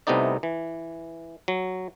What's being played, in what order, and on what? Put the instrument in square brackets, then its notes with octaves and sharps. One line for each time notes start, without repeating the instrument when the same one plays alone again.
[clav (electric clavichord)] C2 C3 A3 B3 D#4 D5
E3
F#3